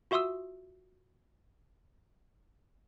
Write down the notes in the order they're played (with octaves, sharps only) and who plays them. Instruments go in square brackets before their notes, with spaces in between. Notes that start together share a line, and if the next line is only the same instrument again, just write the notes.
[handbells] F4 F#4 E5 C6 D#6 E6